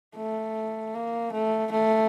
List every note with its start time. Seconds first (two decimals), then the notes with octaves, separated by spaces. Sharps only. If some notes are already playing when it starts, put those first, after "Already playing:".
0.16 A3
0.94 A#3
1.32 A3
1.72 A3